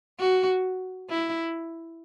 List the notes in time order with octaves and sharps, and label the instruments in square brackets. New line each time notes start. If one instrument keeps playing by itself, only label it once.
[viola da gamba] F#4
E4